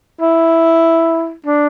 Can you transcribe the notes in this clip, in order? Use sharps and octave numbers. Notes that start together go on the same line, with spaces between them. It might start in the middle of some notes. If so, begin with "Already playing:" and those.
E4
D4